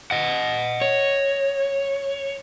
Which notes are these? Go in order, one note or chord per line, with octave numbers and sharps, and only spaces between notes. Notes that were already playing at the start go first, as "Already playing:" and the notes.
D#5 F#5
C#5